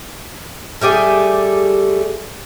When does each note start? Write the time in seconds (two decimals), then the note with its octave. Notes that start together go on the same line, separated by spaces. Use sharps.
0.81 G3 A3 G4 G#4